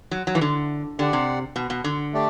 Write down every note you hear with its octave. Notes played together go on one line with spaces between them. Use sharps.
F#3
F#3
E3
D3
D3 G4 D5 F#5
C3
B2
B2
D3
A3 D4 G4 D5